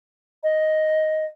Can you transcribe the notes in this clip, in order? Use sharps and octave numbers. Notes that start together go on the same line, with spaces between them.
D#5